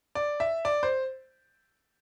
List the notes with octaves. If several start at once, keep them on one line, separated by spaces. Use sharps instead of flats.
D5
E5
D5
C5